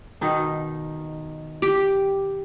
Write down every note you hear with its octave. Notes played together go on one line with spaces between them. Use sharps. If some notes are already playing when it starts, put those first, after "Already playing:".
B2 D#3 D#4
G4